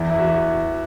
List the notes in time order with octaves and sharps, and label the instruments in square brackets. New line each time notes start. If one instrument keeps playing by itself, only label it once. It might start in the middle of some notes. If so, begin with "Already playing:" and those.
Already playing: [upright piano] E2 E4
E4
E2 F#4